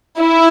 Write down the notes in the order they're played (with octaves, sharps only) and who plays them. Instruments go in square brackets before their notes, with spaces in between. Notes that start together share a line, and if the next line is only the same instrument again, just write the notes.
[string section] E4